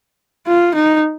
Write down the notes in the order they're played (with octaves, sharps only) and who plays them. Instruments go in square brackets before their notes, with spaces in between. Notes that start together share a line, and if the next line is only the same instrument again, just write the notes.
[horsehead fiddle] F4
D#4